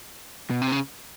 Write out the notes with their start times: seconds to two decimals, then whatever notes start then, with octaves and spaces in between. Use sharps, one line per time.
0.50 B2
0.62 C3
0.72 C#3